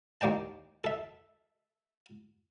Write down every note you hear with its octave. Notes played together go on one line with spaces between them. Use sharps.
D#2 A#3 D5 G5 A5
A4 E5